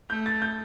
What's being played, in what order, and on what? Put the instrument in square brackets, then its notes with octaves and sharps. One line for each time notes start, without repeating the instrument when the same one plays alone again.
[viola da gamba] A3 [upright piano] G6
[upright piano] A6
G6